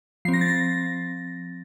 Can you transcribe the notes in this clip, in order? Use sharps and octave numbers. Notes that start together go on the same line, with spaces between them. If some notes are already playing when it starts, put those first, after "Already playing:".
F3 C4 C7
A#6
A6
A#6